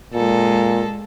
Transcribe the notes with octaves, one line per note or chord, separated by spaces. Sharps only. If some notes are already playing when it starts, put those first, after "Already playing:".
A#2 G#3 A4